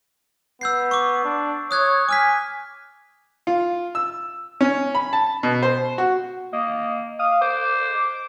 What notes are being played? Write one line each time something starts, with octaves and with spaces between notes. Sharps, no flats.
B3 E6 G6 C7
C#6 D6
D4
C#5 D#6 F#6 G#6
G#5 D6 F6 B6
F4
E6
C#4
B5
A5
B2
C5
F#4
A#3 D#5
F5 D#6
C5 D6